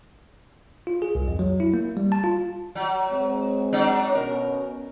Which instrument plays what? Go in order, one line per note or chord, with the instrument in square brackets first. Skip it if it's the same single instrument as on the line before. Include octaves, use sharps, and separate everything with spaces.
[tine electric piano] F4
G#4
C2
F2
F#3
E4
A#3
G3
A5
F4
[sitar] F#3
[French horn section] G#3 C4
[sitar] F#3 D4 D#4
[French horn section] B2 C#4 [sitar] A#4